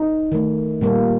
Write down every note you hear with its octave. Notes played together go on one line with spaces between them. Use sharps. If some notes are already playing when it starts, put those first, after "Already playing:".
Already playing: D#4
D#3 A3
A#2 G3 A#3